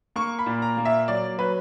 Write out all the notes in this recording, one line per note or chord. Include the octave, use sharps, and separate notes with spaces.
A#3 C#6
B5
A#2
A#5
A#3
E5
F#3 D5
F#3 B4